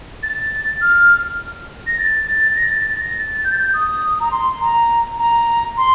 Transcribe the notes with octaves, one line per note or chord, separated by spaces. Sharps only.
A6
F6
A#6
A6
A6
A#6
A6
A6
A#6
A6
G6
A6
G6
D#6
A#5
C6
A#5
A#5
C6